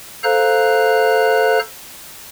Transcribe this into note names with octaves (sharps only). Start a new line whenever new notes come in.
A4 C5 F5 A#5 F#6